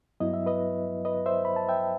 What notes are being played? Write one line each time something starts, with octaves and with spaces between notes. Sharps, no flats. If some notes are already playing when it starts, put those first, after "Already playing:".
G2 F#3 B3 E4 D#5
E5
B4 D#5
B4 D#5
C5 E5
B5
A5
E5 G5